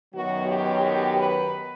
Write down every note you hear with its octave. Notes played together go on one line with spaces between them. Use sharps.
F#2 D#3 F#3 B3 F#4
G4
G4
B4